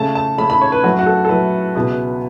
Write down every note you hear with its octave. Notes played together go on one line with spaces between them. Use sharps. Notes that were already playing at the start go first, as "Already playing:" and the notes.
Already playing: C#3 A3 C#4 A5
A5
C#3 A3 C#4 B5
B5
C#5
B4
F#2 F#3 A3 E4 F#4
F#4
A4
A4
F#2 F#3 A3 E4 B4
C#2 B2 B3 E4